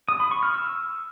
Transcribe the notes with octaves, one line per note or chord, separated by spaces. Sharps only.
D#6
B5
C#6
F6
E6